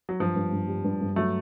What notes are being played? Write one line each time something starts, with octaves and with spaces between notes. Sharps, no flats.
F#3
G2 F3
G2
G2
G3
G2
G2
F#3 A3